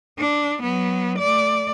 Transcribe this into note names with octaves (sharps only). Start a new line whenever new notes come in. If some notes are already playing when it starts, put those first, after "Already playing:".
D4
F#3 B3
A3 D5